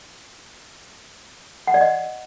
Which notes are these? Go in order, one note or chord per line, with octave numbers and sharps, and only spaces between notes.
F#5
D5
D#5